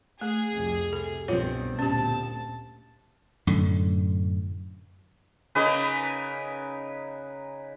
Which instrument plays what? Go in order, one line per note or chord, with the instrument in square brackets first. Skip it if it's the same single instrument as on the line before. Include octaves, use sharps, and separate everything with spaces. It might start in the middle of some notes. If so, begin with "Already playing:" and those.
[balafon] A3 [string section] G#4
[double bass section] C2 F2 C3
[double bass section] C3 [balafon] A4
[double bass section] C2 [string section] G2 [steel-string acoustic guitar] B2 C4 [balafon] F4 C#5
[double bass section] D2 A#2 [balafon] C#4 G4 [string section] A5
[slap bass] F#2 A2 D3
[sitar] C#3 A#3 [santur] D#4 G#4 B4